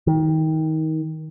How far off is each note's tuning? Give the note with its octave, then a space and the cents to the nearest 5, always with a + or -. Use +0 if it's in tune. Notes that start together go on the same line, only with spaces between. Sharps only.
D#3 +25